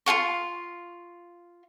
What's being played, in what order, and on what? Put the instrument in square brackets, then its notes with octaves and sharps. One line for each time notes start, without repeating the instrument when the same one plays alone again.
[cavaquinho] F4 A4 F5 C#6